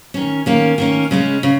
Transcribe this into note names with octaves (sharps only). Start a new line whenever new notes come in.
D#3 C#4
D#3 A#3 C#4
D#3 A#3 C#4
C#3 G#3 C#4
C#3